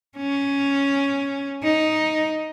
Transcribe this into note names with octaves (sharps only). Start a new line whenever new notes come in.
C#4
D#4